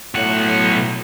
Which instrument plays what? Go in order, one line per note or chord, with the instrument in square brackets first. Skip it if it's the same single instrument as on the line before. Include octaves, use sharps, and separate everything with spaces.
[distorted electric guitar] B1 F#5 [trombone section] A2 F#3